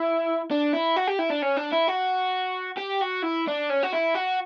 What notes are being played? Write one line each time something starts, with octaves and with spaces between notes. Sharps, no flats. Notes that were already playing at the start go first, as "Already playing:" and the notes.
Already playing: E4
D4
E4
F#4
G4
E4
D4
C#4
D4
E4
F#4
G4
F#4
E4
D4
C#4
F#4
E4
F#4